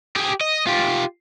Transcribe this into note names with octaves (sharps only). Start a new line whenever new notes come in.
G4 G#4
D#5
F4 G4